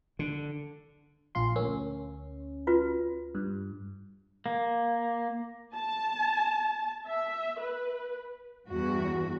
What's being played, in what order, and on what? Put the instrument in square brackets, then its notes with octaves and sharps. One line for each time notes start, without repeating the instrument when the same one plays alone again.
[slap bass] D3
[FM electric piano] A#1 F4 C6
[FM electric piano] D2 C#4 [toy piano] A#4
[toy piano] F4 F#4 B4
[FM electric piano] G2
[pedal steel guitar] A#3
[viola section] A5
E5
B4
[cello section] E2 G2 F#4